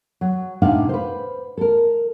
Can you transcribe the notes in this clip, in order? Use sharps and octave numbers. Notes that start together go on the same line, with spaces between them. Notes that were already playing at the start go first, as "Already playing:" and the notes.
F#3
A2 C3 D4 D#4 F5 F#5
B4 C5
A4 A#4